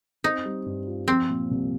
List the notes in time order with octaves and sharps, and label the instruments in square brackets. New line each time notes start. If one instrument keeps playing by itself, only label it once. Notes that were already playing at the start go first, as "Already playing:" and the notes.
[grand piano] C4 [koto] D#4
[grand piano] G3
G2
F4
[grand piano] F3 [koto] C4
[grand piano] A#2
C2